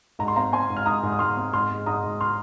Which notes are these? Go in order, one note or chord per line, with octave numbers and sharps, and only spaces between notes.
G#2 A#5
C6
C4 F5 A#5
C4 G#5 C6
G#2
F6
G#2 A#5 D#6
G#2
D#6
G#2 C6 F6
C4
G#2 C6 F6
G#3
G#2 A#5 D#6
G#2
C6 F6